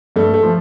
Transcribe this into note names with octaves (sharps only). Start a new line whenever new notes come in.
G2 A3
A3
F3